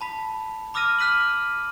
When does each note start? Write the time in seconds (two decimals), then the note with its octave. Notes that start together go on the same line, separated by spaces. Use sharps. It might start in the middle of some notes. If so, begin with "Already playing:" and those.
0.01 A5 B5 B6
0.74 B5 D6 E6 F6 A#6 D#7
0.99 F6 F#6 B6 D#7 F#7